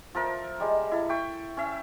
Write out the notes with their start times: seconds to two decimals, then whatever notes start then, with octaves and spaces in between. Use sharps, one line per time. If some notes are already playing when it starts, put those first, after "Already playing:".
0.15 F3 A4 A#4 E5
0.60 G3 G#3
0.92 E4 A4
1.09 E5 G5 C#6
1.57 C#4 E5